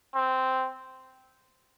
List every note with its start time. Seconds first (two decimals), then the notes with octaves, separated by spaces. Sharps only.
0.15 C4